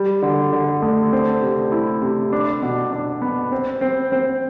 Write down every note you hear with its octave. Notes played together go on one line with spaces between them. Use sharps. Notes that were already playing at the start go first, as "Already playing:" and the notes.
Already playing: G3
D3
D3
D2
C4
C3
E4
C3
D4
B2
D4
B3
C4
C4
C4